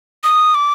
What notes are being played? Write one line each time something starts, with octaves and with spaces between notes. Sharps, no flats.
D#6
D6